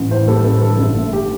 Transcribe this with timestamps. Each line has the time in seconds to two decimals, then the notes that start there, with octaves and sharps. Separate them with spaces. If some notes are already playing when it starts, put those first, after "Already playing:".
Already playing: A1
0.11 A2 C5
0.28 G3 A4
0.45 A1 A4
0.62 D3 A4
0.79 G1
0.96 A3
1.13 G4